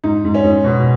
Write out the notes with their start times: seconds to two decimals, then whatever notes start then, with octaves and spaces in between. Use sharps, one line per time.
0.04 G#2 D#4
0.25 G#2
0.34 C#4
0.44 G#2
0.65 B2